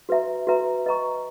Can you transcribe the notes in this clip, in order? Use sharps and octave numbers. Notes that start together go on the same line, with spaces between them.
F#4 B4 E5 A#5
F#4 B4 E5 A#5
B4 D#5 A#5 C#6